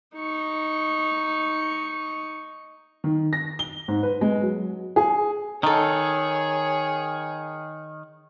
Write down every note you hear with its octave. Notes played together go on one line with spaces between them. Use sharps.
D#4 C#6
D#3
A#6
G7
G#2
B4
G#3
F#3
G#4
D#3 D#4 G#4 A4 C#5